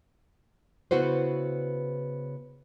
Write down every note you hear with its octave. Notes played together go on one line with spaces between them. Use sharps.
C#3 B3 E4 F#4 B4 C5